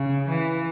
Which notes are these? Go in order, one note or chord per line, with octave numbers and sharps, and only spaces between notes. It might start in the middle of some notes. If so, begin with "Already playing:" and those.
Already playing: C#3
E3